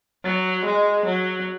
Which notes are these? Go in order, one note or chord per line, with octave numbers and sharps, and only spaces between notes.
F#3
G#3
F#3